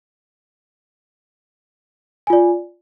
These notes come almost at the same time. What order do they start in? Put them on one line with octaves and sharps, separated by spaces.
G#5 F4 D5